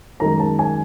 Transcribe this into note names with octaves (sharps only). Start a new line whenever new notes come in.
F#2 D#3 G#3 A#5
A5
G#5